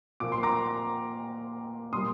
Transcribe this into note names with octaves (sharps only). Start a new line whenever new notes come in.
A#2 F3 A#3 D6
C6
A#5 D6
A#2 G3 A#3 C6 D#6